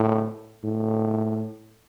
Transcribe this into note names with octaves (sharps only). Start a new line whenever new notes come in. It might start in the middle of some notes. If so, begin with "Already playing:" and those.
Already playing: A2
A2